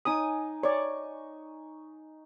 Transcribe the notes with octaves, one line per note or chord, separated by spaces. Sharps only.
D#4 G#5 D6 D#6
C#5 D5 C#6